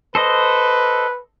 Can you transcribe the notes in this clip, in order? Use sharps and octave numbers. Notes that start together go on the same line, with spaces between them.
A4 B4 C5 D#5